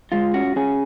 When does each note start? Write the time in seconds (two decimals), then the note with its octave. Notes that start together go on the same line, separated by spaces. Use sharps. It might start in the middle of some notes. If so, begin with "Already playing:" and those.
0.12 G#3 F4
0.34 C#4 F#4
0.56 C#4 G#4